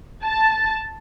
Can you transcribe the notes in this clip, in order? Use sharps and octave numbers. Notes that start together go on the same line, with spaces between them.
A5